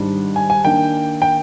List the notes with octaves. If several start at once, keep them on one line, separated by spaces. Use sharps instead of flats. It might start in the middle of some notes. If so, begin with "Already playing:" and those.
Already playing: G#2 D#3 G3 D4
G#5
G#5
D#3 A#3 D4 G5
G5